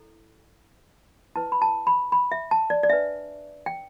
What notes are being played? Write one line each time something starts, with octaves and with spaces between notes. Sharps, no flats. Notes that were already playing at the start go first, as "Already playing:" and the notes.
Already playing: E4 A4
E4 B4 A5
B5
A5
B5
B5
E5
A5
D5
D5
D4 B4 E5
G5